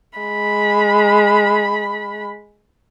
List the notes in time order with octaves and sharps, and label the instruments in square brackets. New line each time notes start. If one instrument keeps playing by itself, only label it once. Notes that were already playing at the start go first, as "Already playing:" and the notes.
[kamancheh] G#3 B5